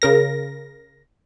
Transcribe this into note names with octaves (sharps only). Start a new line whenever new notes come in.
C#3 A#4 A#6